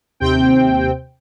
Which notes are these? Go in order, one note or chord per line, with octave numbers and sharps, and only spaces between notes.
D#2 C3 C4 G5